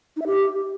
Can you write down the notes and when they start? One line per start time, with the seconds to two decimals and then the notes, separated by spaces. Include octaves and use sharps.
0.16 D#4
0.22 E5
0.27 G4